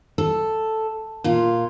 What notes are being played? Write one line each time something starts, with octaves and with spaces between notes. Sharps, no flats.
A4
A#2 F4